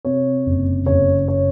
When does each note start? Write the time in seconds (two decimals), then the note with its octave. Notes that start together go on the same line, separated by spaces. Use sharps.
0.05 C3 C#5
0.46 F#1
0.86 F#1 C#5
1.28 C#5